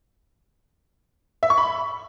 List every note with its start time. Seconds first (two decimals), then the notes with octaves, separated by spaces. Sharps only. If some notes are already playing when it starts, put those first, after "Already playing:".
1.43 E5
1.50 C#6
1.58 B5